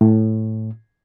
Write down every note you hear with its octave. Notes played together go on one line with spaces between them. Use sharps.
A2